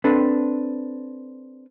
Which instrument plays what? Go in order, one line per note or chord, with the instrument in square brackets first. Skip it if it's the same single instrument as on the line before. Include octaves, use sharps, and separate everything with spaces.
[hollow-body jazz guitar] C4 D4 A4 B4